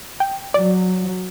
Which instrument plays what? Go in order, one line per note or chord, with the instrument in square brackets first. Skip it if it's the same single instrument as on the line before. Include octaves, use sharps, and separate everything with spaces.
[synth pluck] G5
[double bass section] F#3 [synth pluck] D5